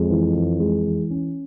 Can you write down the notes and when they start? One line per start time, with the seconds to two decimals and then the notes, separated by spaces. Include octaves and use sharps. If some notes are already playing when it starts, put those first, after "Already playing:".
Already playing: F2 G#3
0.10 E3
0.35 E3
0.60 G#3
0.86 E3
1.10 C#4